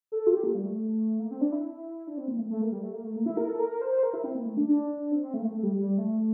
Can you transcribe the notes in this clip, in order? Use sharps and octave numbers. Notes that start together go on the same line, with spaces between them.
A4
F4
G4
A#3
G3
A3
A#3
C4
D4
E4
D4
C4
A#3
A3
A3
A#3
G3
A3
A#3
A3
A#3
E4
A#4
A4
A#4
A#4
C5
C5
A#4
E4
C4
A#3
A3
D4
D4
C4
C4
A3
A#3
A3
A3
G3
G3
A3